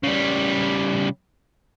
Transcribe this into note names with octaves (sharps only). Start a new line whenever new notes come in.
C#3 G3